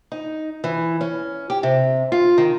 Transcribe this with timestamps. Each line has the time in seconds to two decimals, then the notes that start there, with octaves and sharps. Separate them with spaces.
0.12 D#4
0.64 E3
1.01 C#4
1.50 G4
1.63 C3
2.12 F4
2.38 D#3